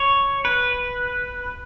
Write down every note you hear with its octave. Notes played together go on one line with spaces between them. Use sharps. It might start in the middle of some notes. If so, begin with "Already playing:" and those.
Already playing: C#5
B4